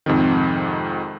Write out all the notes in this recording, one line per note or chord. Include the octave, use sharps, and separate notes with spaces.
F2 G#2 C3 D#3